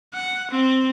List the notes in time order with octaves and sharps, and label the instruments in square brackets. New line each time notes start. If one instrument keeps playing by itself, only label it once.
[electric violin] F#5
C4